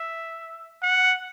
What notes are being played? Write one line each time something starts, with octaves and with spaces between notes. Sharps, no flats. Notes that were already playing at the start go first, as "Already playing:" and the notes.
Already playing: E5
F#5